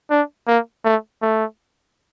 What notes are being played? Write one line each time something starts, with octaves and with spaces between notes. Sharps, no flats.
D4
A#3
A3
A3